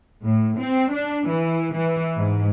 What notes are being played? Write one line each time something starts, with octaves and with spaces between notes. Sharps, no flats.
A2
C4
D4
E3
E3
G#2